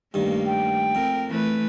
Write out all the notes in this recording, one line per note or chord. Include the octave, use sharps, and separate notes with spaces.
G2 D#3 A3 A#3
G5
F2 A#4
E3 A3 B4